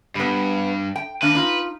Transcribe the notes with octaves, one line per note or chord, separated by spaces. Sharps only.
G2 G3 B3
G5
D#3 A#3 D4 B4
D#4 F4